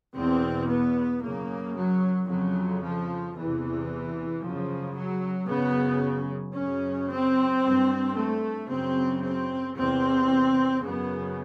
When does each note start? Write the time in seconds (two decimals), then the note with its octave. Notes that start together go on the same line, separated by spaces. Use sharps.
0.14 E2 B2 C4
0.67 B3
1.21 F#2 C#3 A#3
1.75 F#3
2.27 F2 C#3 F#3
2.81 F3
3.34 E2 C3 E3
4.41 F#2 C#3 F3
4.95 F#3
5.48 F#2 C#3 B3
6.54 F#2 C#3 C#4
7.09 C4
7.62 G2
8.14 A3
8.68 F#2 C#3 C4
9.21 C4
9.75 E2 C3 C4
10.82 F#2 C#3 B3